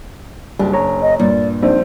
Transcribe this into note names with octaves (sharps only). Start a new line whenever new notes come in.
F#1 F#3 G3 D4
C#5 A#5
D#5
G2 A#2 D5
A#1 C4 D4 D#4 C5